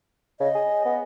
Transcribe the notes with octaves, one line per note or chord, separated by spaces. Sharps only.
C#3 D#5
G#4
B3